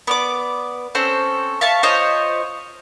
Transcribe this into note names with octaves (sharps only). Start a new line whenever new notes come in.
B3 D5 D6
C4 C#4 A4 C5
E5 F5 A5 C#6
F4 C5 C#5 D#5